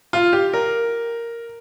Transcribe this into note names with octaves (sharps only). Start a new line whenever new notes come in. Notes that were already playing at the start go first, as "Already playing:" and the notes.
F4
G4
A#4